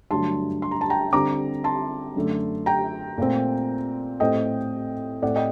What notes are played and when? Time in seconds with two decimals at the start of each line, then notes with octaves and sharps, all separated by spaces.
0.11 G2 D3 F#3 A3 A5 C6
0.62 C6
0.71 A#5
0.81 A5
0.90 G5 A#5
1.13 D3 G3 C4 A#5 D6
1.64 A5 C6
2.16 F#2 D3 A3
2.66 G5 A#5
3.18 A#2 A3 C4
4.20 A2 A3 C4 D#5 G5
5.22 A2 A3 C4 D5 F#5
5.36 D#5 G5